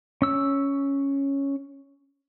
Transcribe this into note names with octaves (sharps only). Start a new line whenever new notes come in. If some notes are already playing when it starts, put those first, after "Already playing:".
C#4 E6